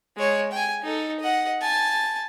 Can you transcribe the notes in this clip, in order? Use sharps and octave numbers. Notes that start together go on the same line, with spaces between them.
G#3 C#5
G5 G#5
D#4 A4
D#5 F#5
G#5 A5